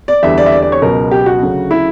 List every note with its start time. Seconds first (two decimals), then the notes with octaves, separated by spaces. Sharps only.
0.08 D5
0.23 E2 D3 G3 E5
0.38 D5
0.46 E5
0.52 D5
0.62 D5
0.72 C#5
0.82 C#2 B2 F#3 A#4
1.11 G4
1.26 F#4
1.41 D2 C#3 F#3
1.71 E4